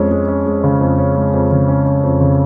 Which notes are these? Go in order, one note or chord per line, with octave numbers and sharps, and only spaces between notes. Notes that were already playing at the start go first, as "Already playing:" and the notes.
Already playing: F2 G#3 C#4
G#3
C#4
G#3
C#3
F2
C#4
G#3
F2
C#3
C#4
C#4
F2
C#3